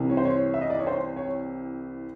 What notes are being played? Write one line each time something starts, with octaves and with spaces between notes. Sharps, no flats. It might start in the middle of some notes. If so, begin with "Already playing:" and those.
Already playing: C2 C3 E3
C#5
C5
C#5
E5
D#5
D5
C#5
C5
C#5